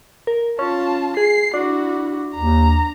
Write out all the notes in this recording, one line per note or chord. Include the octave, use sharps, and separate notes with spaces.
A#4
C#4 F4 A5
G#4 C7
D4 E4 F#4
D#2 A#5